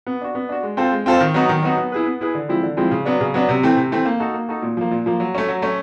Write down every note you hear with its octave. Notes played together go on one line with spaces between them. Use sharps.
B3
D4 F#4
B3
D4 F#4
G#3
C4 F4 A4 C5
G#3
C4 F4 A4 C5
D#3
F#3 B3 D#4 F#4
D#3
F#3 B3 D#4 F#4
B3
E4 G#4 B4
B3
E4 G#4 B4
D3
F3 G#3 C4 E4
D3
F3 G#3 C4 E4
C#3
F#3 B3 D4
C#3
F#3 B3 D4
C3
E3 A3 C4
C3
E3 A3 C4
A#3
D#4 F#4 A4
A#3
D#4 F#4 A4
A#2
F3 A#3
A#2
F3 A#3
F#3
A3 C#4
F#3
A3 C#4